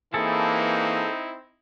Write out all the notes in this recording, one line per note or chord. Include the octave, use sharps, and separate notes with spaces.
E3 A#3 C4 D#4 E4 G#4 A4 A5